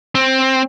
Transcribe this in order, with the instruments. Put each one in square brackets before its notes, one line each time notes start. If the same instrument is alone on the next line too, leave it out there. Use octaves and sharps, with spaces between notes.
[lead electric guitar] C4